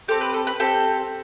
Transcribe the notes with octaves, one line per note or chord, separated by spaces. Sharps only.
C4 G4 A4
B4
A4
B4
C4 G4 A4